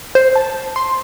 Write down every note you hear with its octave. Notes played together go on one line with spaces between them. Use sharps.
C5
A5
C6